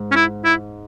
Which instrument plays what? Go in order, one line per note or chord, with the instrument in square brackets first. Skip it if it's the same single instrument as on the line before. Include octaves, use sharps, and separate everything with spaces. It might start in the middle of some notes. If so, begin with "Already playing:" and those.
Already playing: [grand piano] G#2
[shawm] C#4
E4
E4